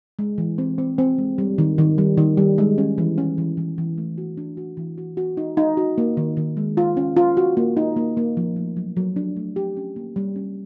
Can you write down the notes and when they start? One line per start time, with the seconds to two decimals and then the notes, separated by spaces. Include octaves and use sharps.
0.19 G#3
0.38 E3
0.58 C4
0.78 C4
0.98 C4
1.18 G#3
1.38 G3
1.58 D#3
1.78 D#3
1.98 G3
2.18 D#3
2.37 G3
2.58 G#3
2.78 C#4
2.98 E3
3.18 C#4
3.38 E3
3.57 E3
3.78 E3
3.98 A3
4.18 F#4
4.37 D4
4.57 F#4
4.77 E3
4.98 F#4
5.17 F#4
5.37 D#4
5.57 D#4
5.77 F#4
5.98 A#3
6.17 D#3
6.37 D#3
6.57 G#3
6.77 F4
6.97 C#4
7.17 F4
7.37 F#4
7.57 A#3
7.77 D#4
7.96 A#3
8.17 A#3
8.37 F3
8.56 A3
8.77 F#3
8.97 F#3
9.16 D4
9.36 A3
9.56 G4
9.77 C#4
9.96 A#3
10.16 G3
10.36 C#4